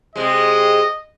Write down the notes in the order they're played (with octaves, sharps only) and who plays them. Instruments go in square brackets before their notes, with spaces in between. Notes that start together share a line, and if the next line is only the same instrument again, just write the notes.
[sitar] C3 G#3 [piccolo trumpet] D#5